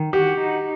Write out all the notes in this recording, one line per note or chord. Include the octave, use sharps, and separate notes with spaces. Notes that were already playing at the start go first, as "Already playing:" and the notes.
Already playing: D#3
F#4 G4
D#4